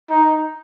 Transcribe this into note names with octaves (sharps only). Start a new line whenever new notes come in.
D#4